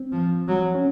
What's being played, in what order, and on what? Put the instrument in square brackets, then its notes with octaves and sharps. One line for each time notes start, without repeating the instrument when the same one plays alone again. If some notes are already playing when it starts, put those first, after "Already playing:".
Already playing: [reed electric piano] C4
[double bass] F3
F#3
[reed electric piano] C#4